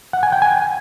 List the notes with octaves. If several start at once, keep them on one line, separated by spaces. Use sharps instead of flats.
F#5
G#5
G5
G#5